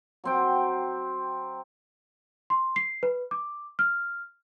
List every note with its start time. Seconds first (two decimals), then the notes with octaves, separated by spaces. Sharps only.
0.24 F#3 C4 G5
2.50 C6
2.76 C7
3.03 B4
3.31 D6
3.79 F6